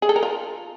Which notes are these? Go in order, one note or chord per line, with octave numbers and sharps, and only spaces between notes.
G#4
A4
A#4
F4